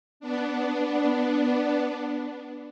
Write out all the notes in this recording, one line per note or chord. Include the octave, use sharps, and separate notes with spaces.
B3 D4